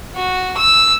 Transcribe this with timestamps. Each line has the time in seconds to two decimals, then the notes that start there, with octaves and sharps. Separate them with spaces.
0.16 F#4
0.57 E6